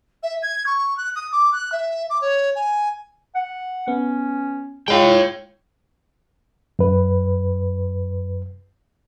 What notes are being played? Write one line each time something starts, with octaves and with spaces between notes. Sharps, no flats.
E5
G#6
C#6
F#6
D#6
D6
F#6
E5
D6
C#5
G#5
F#5
B3 C#4
G#3 F4 C#5 G5
F#2 B4